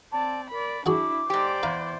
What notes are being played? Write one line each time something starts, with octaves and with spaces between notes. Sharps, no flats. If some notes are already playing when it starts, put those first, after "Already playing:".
C4 D5 A5
A#4 D5 B5
D4 E4 F#4 G#4 F#5 D6
G#2 G4 C5 D5
E2 F5 A#5 B5